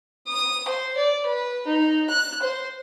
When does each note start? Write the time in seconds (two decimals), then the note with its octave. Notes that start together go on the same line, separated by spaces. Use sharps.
0.28 D#6
0.68 C5
0.97 D5
1.26 B4
1.67 D#4
2.09 F#6
2.42 C5